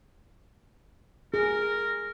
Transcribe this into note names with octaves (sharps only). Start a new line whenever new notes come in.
G#4 A#4